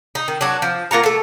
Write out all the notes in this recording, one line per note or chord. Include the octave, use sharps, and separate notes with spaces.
D#4
D#3
F#3 D4
F3
A#3 F4 F#5 A#5
A3 A4